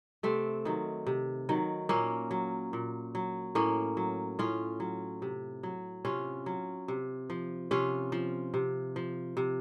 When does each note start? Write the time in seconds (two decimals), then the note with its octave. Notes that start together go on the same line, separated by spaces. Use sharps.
0.23 C3 A3 C4
0.65 D#3 F#3
1.07 C3
1.49 D#3 F#3
1.89 A#2 A#3 C#4
2.31 F#3
2.73 A#2
3.15 F#3
3.55 A2 A#3 C#4
3.97 F#3
4.39 A2 C#4 F4
4.80 F#3
5.22 C3
5.63 F#3
6.05 C3 C#4 F4
6.46 F#3
6.88 C3
7.30 F3
7.71 C3 C#4 F4
8.12 F3
8.54 C3
8.96 F3
9.37 C3